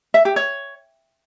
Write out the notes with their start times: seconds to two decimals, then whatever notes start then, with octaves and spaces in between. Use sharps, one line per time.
0.14 E5
0.25 G4
0.36 C#5